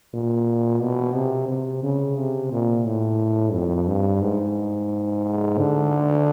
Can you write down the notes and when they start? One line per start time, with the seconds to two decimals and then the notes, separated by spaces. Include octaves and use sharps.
0.13 A#2
0.81 B2
1.15 C3
1.49 C3
1.83 C#3
2.17 C3
2.52 A#2
2.85 A2
3.54 F2
3.87 G2
4.22 G#2
5.58 D3